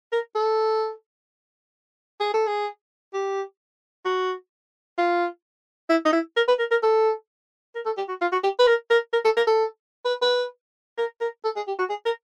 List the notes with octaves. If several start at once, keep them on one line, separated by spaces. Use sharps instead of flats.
A#4
A4
G#4
A4
G#4
G4
F#4
F4
E4
D#4
E4
A#4
B4
A#4
A#4
A4
A#4
A4
G4
F#4
F4
F#4
G4
B4
A#4
A#4
A#4
A4
A#4
A4
B4
B4
A#4
A#4
A4
G#4
G4
F#4
G#4
A#4